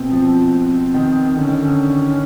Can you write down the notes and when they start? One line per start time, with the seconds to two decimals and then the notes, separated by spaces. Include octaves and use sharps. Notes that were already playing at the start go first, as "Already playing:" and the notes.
Already playing: B2 C4
0.11 F3
0.94 D#3
1.36 D3 C#4
1.48 D#3
1.61 D3